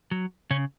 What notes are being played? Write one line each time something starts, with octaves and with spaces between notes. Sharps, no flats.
F#3
C#3 C#4